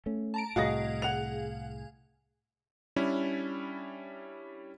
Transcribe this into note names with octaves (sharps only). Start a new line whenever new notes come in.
A3 C#4
A5 A#5 D7
C2 A2 F#4 G#4 D#5 F5 A#6
F#5 F7
G3 C#4 D4 E4